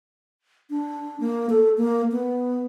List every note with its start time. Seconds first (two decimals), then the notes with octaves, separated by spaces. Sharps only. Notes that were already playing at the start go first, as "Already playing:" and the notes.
0.70 D4
1.20 A#3
1.50 A4
1.78 A#3
2.12 B3